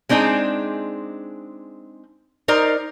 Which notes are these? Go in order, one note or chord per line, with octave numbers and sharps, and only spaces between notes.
G#3 C4 D4 D#4 G#4
D#4 A#4 C5 D5